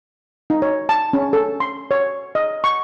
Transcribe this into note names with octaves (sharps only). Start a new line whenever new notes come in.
D#4
C#5
A5
C#4
A4
C6
C#5
D#5
C#6